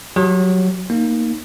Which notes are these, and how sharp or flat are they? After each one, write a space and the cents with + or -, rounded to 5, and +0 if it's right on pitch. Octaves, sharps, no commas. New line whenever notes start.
F#3 +0 G4 +0
A#3 +0 D#4 +0